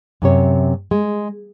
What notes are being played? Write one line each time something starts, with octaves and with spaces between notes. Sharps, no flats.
F#2 C3 C#5
G#3